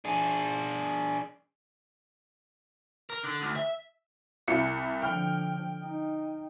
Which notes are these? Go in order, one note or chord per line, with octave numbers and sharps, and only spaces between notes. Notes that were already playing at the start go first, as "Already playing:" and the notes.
D4 G#4
A#4
D3
D2
E5
C2 E4 C#7
D3 F3 G5 F6
D#4